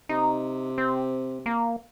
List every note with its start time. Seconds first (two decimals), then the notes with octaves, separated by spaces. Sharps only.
0.09 C3 D#4
0.78 C4
1.46 A#3